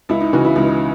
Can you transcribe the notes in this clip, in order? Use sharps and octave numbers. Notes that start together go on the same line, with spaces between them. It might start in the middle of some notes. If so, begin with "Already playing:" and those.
C#2 E4
D#4
C#3 E3 F#4
E4
C#2 D#4